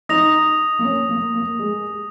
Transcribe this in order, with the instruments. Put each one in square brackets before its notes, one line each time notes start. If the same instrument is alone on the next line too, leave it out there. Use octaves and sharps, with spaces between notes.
[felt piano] D#4 [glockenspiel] D#6 A#6 F7
[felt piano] A#3
C#4
A#3
A#3
G#3